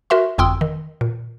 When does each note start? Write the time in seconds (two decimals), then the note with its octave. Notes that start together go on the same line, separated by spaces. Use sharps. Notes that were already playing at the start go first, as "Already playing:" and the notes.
0.10 F#4 A#4 E5 C6
0.38 G1 F2 G5 C6 D#6 E6
0.61 D#3
1.01 A#2